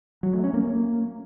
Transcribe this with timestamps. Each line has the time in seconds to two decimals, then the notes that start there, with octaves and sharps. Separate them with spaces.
0.23 F#3
0.33 A3
0.44 C#4
0.54 A#3
0.64 A#3